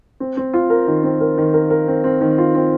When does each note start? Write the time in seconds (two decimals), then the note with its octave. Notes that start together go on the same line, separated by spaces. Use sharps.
0.20 C4
0.37 C4
0.54 F4
0.70 A#4
0.87 D#3
1.04 C4
1.21 A#4
1.38 D#3
1.54 A#4
1.70 A#4
1.88 C4
2.04 C4
2.21 D#3
2.38 F4
2.55 C4